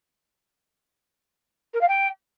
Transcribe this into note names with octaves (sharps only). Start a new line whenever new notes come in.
A#4
F5
G5